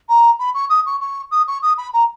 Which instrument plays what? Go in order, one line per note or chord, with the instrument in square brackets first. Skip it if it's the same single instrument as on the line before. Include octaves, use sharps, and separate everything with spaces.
[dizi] A#5
B5
C#6
D#6
C#6
C#6
D#6
C#6
D#6
B5
A#5